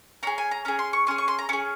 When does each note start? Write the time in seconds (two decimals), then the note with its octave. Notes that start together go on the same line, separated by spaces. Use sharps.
0.23 C#4 G#4 A#5
0.38 G#5
0.51 A#5
0.65 C#4 G#4 A#5
0.79 C6
0.93 C#6
1.07 C#4 G#4 C6
1.18 C#6
1.28 C6
1.39 A#5
1.49 C#4 G#4 C#6